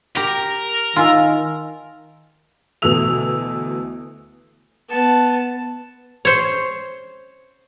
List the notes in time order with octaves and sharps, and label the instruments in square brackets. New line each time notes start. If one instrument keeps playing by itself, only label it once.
[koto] G4 [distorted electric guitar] A#4
[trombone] D#3 [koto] F4 [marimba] F5 G#5 E6
[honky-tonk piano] D2 B2 E3 A3 E6 F7
[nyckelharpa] B3 A5
[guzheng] C5 C#5